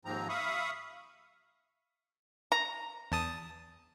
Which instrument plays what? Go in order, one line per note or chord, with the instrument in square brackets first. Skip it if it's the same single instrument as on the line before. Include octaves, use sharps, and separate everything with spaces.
[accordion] D#2 G#2 F3 C4 A#5
E5 F5 B5 C#6 D#6
[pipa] A#5
[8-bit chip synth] E2 A5 D#6